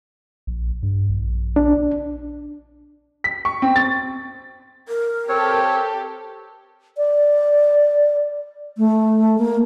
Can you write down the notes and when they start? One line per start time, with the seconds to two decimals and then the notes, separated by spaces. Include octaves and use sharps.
0.47 A#1
0.83 G2
1.10 A#1
1.56 D4
3.24 B6
3.45 C#6
3.62 C4
3.76 A6
4.88 A#4
5.29 C4 G4 A4 C#5
6.97 D5
8.78 A3
9.38 A#3